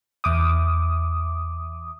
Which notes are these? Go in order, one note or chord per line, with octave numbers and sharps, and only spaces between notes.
E2 D6 D#6